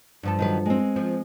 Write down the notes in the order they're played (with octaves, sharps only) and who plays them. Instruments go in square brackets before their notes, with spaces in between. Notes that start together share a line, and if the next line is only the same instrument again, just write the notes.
[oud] G2 F3 A4
[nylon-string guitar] D#3 F#3 B4
G#3 C4
[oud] F3